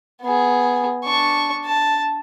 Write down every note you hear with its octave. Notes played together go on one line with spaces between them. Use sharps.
B3 G#4
D4 C#6
A5